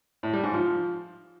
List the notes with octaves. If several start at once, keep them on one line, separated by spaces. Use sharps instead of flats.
A2
G3
G#2
F3